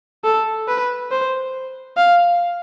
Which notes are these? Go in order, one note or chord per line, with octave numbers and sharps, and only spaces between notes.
A4
B4
C5
F5